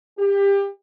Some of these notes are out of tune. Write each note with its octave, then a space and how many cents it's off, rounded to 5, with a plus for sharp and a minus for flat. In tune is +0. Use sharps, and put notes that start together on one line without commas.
G4 +25